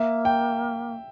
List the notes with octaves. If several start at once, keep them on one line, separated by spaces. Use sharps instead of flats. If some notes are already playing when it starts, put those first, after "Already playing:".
Already playing: A#3 E5
G5